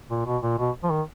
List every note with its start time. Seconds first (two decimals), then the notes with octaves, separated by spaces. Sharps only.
0.10 A#2
0.26 B2
0.43 A#2
0.59 B2
0.84 F3
0.91 D#3